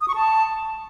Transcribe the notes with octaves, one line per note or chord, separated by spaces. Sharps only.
D#6
C#6
A5